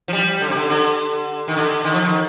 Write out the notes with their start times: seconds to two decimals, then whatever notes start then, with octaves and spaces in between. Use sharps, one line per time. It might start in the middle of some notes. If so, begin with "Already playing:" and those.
0.08 F3
0.13 G3
0.41 D3
0.49 C3
0.56 D3
0.70 D3
1.48 D#3
1.56 D3
1.84 D#3
1.94 F3
2.03 D#3